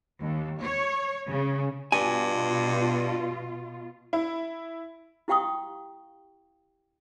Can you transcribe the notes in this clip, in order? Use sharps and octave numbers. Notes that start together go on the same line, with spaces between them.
D#2
C#5
C#3
G2 B2 F4 G#5
E4
E4 G4 F5 G5 C#6 D#6